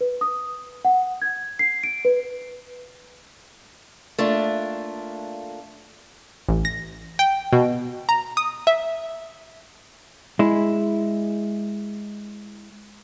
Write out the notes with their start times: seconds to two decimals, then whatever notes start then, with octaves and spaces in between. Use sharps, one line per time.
0.01 B4
0.21 D#6
0.85 F#5
1.22 G#6
1.59 C7
1.84 D7
2.05 B4
4.18 A3 A#3 D4 F4
6.49 A1
6.65 A#6
7.19 G5
7.53 B2
8.09 A#5
8.37 D#6
8.67 E5
10.39 G#3 E4